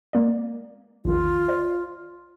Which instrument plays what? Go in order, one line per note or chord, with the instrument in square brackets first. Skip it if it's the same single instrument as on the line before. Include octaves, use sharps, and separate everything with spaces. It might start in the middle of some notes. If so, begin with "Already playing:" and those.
[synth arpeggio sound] G#3 A#3 D5
[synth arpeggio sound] A#1 E2 D#3 [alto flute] F4
[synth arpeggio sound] C5 D5